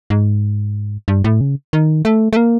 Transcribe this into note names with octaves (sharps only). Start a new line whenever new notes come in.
G#2
G2
A2
C#3
D#3
A3
A3
A#3